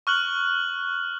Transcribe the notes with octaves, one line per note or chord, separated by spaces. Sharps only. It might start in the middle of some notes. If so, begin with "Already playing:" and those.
C#6 F6 F#6 F#7